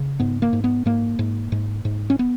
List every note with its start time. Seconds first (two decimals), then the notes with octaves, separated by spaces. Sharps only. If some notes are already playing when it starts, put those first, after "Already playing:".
Already playing: C#3
0.20 G#2 B3
0.42 A#3
0.53 G#2
0.64 B3
0.86 G#2 A#3
1.19 G#2
1.52 G#2
1.85 G#2
2.10 C#4
2.19 B3